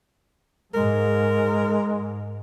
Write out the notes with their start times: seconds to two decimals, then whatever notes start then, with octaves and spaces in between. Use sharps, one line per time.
0.74 G#2 G#3 A#4